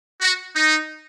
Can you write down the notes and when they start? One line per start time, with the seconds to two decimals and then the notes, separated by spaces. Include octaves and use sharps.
0.21 F#4
0.55 D#4